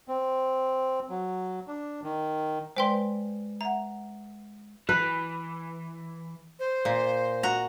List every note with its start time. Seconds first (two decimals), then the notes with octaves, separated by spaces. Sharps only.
0.08 C4
1.09 F#3
1.68 D4
2.04 D#3
2.77 G#3 B4 C5 D5 G5 C6
3.61 E5 F#5 A#5
4.89 E3 B4
6.59 C5
6.85 A#2
7.43 F#4 A#5